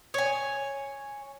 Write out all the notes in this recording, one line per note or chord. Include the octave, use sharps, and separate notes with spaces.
C#5 G#5